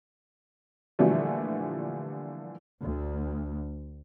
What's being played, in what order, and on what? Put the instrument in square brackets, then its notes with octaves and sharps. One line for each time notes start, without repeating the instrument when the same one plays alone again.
[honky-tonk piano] A#2 D3 E3 F3 G3 A3
[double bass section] D2